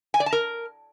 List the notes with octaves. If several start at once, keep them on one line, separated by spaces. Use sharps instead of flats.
G#5
D5
A5
A#4